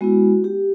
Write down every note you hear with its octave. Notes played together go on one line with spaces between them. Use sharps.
G#3 B3 E4 F#4
G4